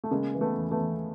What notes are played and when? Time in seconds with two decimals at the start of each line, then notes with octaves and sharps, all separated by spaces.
0.04 A3
0.11 C#3 G#3 A#3
0.34 E3
0.41 A3 B3
0.57 E2
0.71 A3 B3
0.79 E2